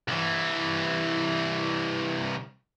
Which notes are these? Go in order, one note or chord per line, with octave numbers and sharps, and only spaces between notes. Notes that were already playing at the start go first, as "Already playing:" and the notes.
C2 E3